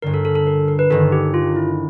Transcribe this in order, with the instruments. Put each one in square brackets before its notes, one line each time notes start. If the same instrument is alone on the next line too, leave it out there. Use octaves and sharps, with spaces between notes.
[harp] G1 G2 D3 [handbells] A#4
[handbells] A4
A4
A4
A#4
A#4
B4
[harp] G1 G2 D#3 [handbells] A4
[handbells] G4
F4
E4